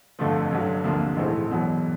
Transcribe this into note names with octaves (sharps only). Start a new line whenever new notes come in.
G1 F2 D3 F3 A3
G1 G2 D3 F#3
D2 C3 F3 A#3 D4
A#1 G#2 E3 A3 C4
E1 E2 B2 F#3